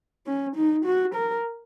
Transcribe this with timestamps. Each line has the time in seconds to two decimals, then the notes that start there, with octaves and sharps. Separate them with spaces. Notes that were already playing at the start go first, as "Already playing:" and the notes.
0.27 C#4
0.56 D#4
0.85 F#4
1.14 A#4